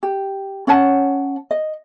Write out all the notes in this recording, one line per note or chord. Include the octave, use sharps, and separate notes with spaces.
G4
C#4 C#5 F#5 A5
D#5